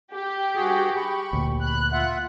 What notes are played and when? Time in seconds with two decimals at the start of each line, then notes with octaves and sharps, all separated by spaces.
0.13 G4
0.55 G2 F#4 G#4
0.96 B5 C#6
1.33 D2 A#2
1.64 B5 F#6
1.92 F4 E5 F#5